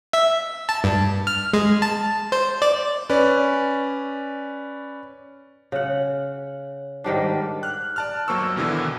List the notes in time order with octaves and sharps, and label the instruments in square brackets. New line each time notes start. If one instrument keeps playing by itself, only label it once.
[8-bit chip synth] E5
A5
G2
F6
G#3
A5
C5
D5
[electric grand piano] C#4 B4 D5
[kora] C#3 F#5
G#2 D#3 G3 D4
[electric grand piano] F6 F#6
D5 A5 F6
G1 F#3 A#3 C5 C#6 E6
D#2 B2 D3 E3